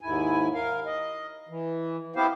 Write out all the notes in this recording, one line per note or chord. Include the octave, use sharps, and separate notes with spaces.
D#2 G#2 E4 G#5
A#4 F5
D#5
E3
B3 C4 E4 G4 C5 F5